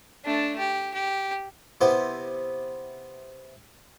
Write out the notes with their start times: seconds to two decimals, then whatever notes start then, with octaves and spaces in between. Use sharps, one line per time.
0.25 A3 D4
0.59 G4
0.94 G4
1.81 C3 B3 C4 E4 G4